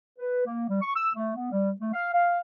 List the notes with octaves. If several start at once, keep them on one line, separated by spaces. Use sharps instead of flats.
B4
A#3
G3
C#6
E6
A3
B3
G3
A3
F5
F5